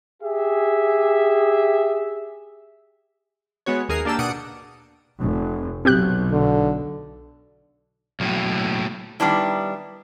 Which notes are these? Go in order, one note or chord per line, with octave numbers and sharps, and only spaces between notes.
G4 G#4 E5
G#3 B3 F#4 C#5
D#2 G#4 A#4 C7
A#3 D4 G4 A5 E6
B2 D4 D#6 F#6 C#7 D7
F1
B1 C4 G4 F#6
D3
B1 A2
D#3 G3 B3 D4 E4